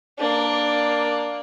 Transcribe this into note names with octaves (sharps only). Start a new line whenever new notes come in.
A#3 D4